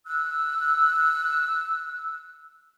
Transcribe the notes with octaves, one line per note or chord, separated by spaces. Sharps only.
E6 F#6